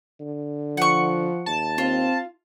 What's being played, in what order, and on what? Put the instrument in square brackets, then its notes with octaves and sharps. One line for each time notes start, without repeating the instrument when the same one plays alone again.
[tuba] D3
[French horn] F3 [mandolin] F#5 C#6
[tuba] D#2 [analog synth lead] A5
[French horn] C4 [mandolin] F4